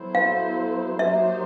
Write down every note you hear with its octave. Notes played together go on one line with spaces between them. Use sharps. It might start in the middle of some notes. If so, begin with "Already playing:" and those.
Already playing: F#3 B3 E4 A4 C5
F5
F#3 A#3 D#4 G4 C5 E5